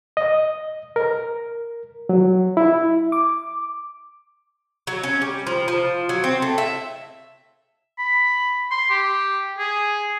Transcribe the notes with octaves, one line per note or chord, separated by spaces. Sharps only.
D#5
A#4
F#3
E4
D6
F#3
C#4
G3
F3
F3
F#3
C4
A3
E5
B5
C6
G4
G#4